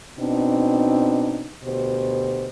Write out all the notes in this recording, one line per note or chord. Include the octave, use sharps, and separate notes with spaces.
B2 C4 D4 D#4
D2 B2 G4 C5